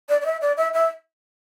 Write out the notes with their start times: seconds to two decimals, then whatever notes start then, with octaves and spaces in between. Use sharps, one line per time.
0.09 D5
0.22 D5
0.26 E5
0.41 D5
0.57 E5
0.74 E5